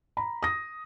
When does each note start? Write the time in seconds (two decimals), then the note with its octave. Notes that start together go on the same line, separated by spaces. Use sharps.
0.17 A#5 B5
0.43 D#6 A#6